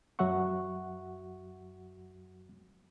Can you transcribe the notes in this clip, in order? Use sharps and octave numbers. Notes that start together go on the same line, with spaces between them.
F#2 F#3 F#4 E5 F#5 C#6